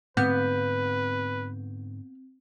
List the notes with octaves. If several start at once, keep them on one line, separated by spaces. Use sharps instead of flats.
G#2 D3 B3 C4 B4 G6